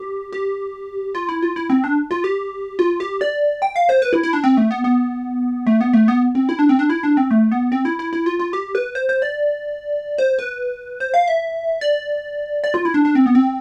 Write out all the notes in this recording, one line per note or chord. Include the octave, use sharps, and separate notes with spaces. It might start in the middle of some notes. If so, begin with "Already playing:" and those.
Already playing: G4
G4
F4
E4
F4
E4
C4
D4
F4
G4
F4
G4
D5
G5
F5
C5
B4
E4
E4
D4
C4
A3
B3
B3
A3
B3
A3
B3
C4
E4
D4
C4
D4
E4
D4
C4
A3
B3
C4
E4
E4
E4
F4
F4
G4
B4
C5
C5
D5
C5
B4
C5
F5
E5
D5
D5
F4
E4
D4
D4
C4
B3
C4